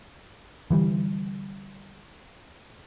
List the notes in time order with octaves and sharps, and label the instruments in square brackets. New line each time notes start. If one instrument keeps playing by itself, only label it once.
[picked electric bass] D3 E3 G3